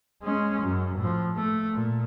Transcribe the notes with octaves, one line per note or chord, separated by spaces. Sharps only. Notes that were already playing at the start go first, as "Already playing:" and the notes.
G#3 C#4
F#2
A2 F3
A3
A#2